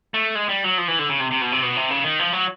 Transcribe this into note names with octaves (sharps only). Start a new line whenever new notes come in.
A3
G#3
G3
F#3
F3
E3
D3
C#3
C3
C3
B2
C3
B2
C3
C#3
D#3
F3
F#3